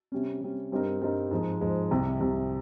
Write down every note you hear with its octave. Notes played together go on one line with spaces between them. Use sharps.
C3 G3 C#4
C3 G3 C#4
G2 G3 C4 D#4 A#4
G2 G3 C4 D#4 A#4
G#2 F3 G#3
G#2 F3 G#3
C2 C3 G3
C2 C3 G3